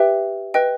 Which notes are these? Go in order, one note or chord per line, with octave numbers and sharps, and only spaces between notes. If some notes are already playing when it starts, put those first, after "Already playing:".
Already playing: G4 B4 E5 G5
B4 D#5 G5